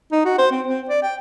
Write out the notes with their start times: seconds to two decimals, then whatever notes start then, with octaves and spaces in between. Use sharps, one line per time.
0.12 D#4
0.25 F#4
0.38 C5
0.51 C4
0.68 C4
0.89 D5
1.03 G5